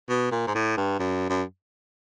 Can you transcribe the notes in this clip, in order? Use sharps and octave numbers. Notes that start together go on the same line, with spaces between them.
B2
A#2
G#2
A2
G2
F#2
F#2